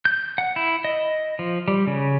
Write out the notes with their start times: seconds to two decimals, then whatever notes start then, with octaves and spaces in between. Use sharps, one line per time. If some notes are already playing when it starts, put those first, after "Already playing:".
0.05 G6
0.38 F#5
0.56 E4
0.85 D#5
1.39 F3
1.68 G3
1.87 C#3